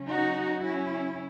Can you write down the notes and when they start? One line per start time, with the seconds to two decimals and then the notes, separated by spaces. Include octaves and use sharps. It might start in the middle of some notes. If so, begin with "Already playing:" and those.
Already playing: C#3 F#3 C#4
0.09 D#4 F#4
0.63 C#4 E4